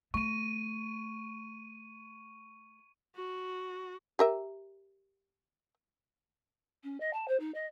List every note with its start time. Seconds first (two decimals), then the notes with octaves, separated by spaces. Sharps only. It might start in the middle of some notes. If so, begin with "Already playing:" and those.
0.14 A3 C#6 D#7
3.16 F#4
4.19 G4 A#4 E5
6.83 C#4
7.00 D#5
7.13 A5
7.28 C5
7.39 D#4
7.54 D#5